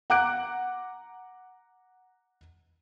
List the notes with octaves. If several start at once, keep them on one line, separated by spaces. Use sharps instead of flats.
F#5 A#5 D6 F#6 D7